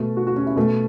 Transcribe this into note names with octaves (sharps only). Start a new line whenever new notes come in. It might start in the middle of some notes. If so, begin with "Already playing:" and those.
Already playing: B2 A3
F#4
F#4
C#4
E4
B2 A3